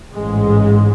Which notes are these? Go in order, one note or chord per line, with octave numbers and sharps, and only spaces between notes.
A1 G#2 G#3